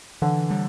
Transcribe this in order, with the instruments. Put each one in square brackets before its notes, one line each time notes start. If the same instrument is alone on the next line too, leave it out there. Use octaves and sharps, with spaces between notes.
[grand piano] D3 [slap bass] E3
[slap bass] G3